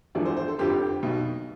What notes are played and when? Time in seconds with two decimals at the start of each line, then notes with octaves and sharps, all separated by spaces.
0.15 E1 E2 D3 F3 D5
0.25 C5
0.37 C5
0.48 A4
0.59 F1 F2 D3 F3 G4
1.03 B1 B2